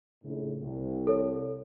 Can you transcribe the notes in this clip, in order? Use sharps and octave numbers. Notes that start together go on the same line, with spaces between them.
A#1 A2 C#3
C2
A4 C#5